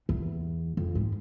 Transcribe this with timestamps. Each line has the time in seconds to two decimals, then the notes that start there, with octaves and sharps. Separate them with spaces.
0.09 E2
0.77 F2
0.95 G#2